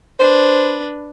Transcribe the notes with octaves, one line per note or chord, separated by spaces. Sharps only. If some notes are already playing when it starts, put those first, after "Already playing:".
D4 B4 C5